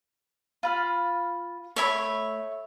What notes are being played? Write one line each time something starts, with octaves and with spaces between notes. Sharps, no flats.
F4 B5 F6
A3 C#5 E5 B5